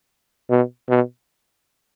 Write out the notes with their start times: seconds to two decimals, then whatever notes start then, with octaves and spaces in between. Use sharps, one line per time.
0.50 B2
0.89 B2